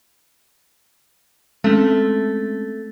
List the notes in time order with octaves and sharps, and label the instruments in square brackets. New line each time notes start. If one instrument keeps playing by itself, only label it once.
[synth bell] G#3 C4 C#4 [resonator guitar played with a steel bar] A3